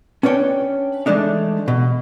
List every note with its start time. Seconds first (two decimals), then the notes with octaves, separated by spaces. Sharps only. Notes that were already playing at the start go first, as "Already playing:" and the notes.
0.23 C#4 D4 B4 C#5 G5
1.06 E3 G#3 A3 D4 D#4
1.68 B2